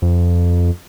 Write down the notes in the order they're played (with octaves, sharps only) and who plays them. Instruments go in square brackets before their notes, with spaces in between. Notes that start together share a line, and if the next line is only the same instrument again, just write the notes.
[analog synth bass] F2